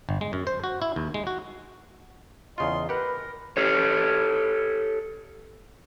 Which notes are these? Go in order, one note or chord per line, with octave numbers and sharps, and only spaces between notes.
G1
G#3
F#2
C5
F#4
E4
D#2
G#3
F#4
E2 C#3 F4 D#5 C6
G4 A#4 B4 F#5
G4 A4 C#5